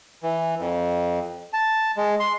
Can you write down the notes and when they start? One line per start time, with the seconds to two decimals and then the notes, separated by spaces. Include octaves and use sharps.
0.23 E3
0.60 F2
1.53 A5
1.97 G#3
2.20 C6